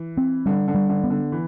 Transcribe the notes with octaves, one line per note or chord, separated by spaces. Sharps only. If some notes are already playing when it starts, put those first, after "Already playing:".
Already playing: E3
C4
D3 G3
D3
G3
D3
B3
D3
E3